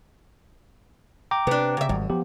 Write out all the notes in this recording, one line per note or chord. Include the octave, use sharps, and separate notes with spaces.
G5 A#5 D6
C3 B3 D4
C#3 E5
G#1 F#2 G3
F3 B3 G4